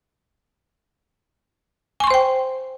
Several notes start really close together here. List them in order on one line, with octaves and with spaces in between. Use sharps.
G#5 C#6 C6 C5 G5